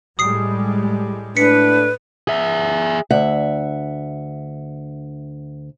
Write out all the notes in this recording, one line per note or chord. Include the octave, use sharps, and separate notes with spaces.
A2 G3 G#3 D#6 C7
A2 D4 B4 B6 C#7
G#4 E5
D2 E5 F#5